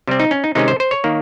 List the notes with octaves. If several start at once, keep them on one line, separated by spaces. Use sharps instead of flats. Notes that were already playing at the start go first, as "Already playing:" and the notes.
C3 G3 C4
D#4
C#4
D#4
C3 D#3 G#3 C#4 D#4
C5
C5
C#5
D#3 A#3